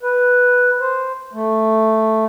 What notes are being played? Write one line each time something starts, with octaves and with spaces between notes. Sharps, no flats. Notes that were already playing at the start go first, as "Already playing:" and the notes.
B4
C5
A3